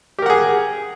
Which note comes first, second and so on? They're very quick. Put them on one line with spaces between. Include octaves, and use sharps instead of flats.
G4 A#4 F#5 G#4